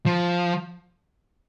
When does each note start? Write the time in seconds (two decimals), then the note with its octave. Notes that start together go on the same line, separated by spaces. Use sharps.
0.06 F3